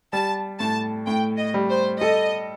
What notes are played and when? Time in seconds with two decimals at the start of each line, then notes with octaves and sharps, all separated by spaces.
0.13 G3 A5
0.60 A2 A5
1.06 A2 G5
1.38 D#5
1.54 G3
1.70 C5
2.00 A4 D#5